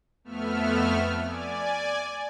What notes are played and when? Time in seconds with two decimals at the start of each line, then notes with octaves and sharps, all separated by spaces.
0.24 F2 A3 B3 E5 F6
1.24 D5 G#5